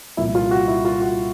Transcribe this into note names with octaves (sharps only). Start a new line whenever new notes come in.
C2 A#2 F3 E4
F4
F#4
E4
F4
F#4